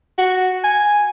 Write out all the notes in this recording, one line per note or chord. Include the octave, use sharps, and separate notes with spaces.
F#4
G#5